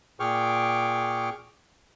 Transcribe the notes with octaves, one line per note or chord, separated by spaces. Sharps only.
A#2 G#4 G5 C#6 D6 F6